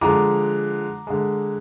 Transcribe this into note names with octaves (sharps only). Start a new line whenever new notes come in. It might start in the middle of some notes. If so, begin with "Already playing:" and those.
D3 F3 G#3 A#5 D6
D3 G#3